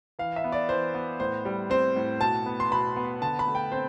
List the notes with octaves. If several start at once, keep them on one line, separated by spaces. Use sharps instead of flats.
E3 F5
E5
B3
D5
E3 C5
B3
A2 C5
G3
C4 C5
A2
B2 A5
B3
C6
B2 B5
B3
D3 A5
B5
A3
G5
C4 C5